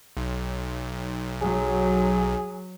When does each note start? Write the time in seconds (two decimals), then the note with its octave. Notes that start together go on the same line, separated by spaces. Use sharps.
0.17 B1
1.42 F#3 G#4